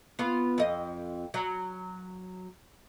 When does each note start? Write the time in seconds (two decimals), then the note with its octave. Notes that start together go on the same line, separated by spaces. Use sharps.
0.19 B3 F4
0.58 F2 D#5
1.34 F#3